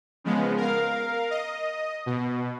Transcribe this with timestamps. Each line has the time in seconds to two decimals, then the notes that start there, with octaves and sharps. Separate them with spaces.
0.24 C#3 F3 G#3 B3
0.57 A#4 F5
1.31 D#5
2.06 B2